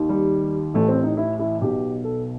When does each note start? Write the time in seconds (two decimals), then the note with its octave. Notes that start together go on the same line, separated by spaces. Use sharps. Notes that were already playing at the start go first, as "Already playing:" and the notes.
Already playing: D#2 D#3
0.09 G3
0.74 A1 A2 E3 A3
0.88 C4
1.03 D#4
1.17 E4
1.39 E4
1.61 B1 B2 G4
2.04 A4